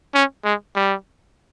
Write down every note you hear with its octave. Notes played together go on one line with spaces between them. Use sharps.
C#4
G#3
G3